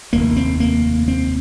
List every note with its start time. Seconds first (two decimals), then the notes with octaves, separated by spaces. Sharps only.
0.12 F1 D#2 A#3
0.36 C4
0.60 A#3
1.08 C4